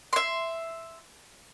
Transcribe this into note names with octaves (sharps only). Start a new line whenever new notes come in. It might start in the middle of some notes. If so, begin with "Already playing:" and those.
E5 C6